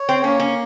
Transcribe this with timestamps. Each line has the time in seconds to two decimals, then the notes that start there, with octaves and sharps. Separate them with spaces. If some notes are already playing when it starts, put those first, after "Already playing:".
Already playing: C#5
0.09 C4
0.24 A#3 C#4
0.40 C#4